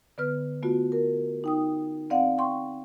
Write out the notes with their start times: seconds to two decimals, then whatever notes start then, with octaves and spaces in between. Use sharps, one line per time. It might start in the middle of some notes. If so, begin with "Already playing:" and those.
0.18 D3 B3 B4 F6
0.63 A3 B3 F4 F#4
0.92 A#4
1.44 D#4 G5 D#6
2.10 C4 D5 F5 F#5
2.38 G5 C6 C#6